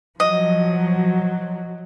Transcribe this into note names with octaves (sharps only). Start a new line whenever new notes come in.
F3 F#3 D#5